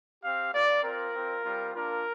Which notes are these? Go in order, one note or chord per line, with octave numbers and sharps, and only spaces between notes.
C4 G4 F5
A#3 F4 D5
C4 F4 A#4
C4 F4
G3 C4 F4
A#3 D4 F4 A#4